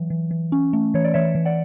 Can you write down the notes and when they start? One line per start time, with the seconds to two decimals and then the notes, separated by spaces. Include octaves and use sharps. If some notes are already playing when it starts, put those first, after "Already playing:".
Already playing: E3 F#3
0.10 E3
0.31 E3
0.52 C#4
0.73 A3
0.94 E3 C#5
1.04 D5
1.14 E3 C#5 E5
1.35 E3
1.45 D5 F#5